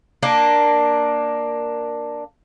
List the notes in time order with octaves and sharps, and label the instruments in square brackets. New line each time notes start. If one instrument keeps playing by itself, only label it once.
[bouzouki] A#3 D4